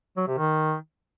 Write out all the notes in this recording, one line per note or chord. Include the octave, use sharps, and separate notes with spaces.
F#3
C3
D#3